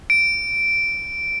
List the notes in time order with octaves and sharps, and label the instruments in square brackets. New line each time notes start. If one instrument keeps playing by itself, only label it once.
[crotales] D7